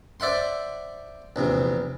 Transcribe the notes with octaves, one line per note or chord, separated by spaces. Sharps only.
C5 D5 E5 F#5 C6
A#1 E2 C3